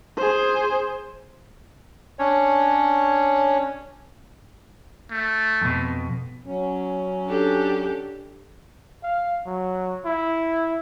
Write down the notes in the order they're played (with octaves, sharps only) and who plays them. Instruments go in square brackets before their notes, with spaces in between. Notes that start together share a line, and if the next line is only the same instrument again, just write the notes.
[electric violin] G#4 C5
[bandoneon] C#4 D4 C#5
[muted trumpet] A3
[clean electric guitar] F2 B2
[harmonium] F#3 C#4
[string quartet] D4 G4 A4
[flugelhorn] F5
F#3
E4